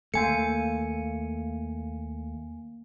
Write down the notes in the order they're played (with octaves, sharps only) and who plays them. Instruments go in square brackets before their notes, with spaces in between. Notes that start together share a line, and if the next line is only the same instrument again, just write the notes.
[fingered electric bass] D#2 A3 [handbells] A#3 G#5 C#7